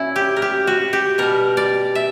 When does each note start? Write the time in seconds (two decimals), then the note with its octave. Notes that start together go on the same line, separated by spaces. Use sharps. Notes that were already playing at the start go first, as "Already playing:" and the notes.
Already playing: A#2 F#3 C#4 E4
0.16 G4
0.36 A#4
0.42 G4
0.67 F#4
0.93 G4
1.18 B2 G3 A#4
1.57 D5
1.95 E5